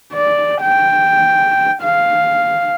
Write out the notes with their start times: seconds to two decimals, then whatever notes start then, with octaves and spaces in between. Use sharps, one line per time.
0.13 D5
0.61 G5
1.82 F5